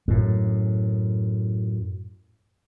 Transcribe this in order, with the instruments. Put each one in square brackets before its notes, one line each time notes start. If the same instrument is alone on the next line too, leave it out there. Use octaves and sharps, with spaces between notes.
[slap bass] F#2 A2